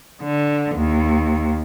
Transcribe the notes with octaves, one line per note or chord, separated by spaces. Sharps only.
D3
D#2